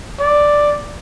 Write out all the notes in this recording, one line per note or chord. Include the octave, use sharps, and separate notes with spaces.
D5